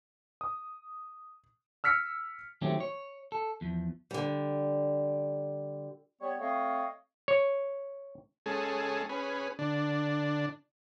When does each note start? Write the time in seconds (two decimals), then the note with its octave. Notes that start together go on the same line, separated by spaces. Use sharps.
0.41 D#6
1.84 E6 F6 B6 C#7
2.62 D#3 F#3 A3 C4 C#4 G4
2.80 C#5
3.32 A4
3.61 E2 F3
4.11 D3 G3
6.21 G3 B3 C#5
6.41 A3 C4 C#5 D#5 F5
7.28 C#5
8.46 G#3 C#4 G#4 A4
9.09 C#4 G#4 B4
9.59 D3 D4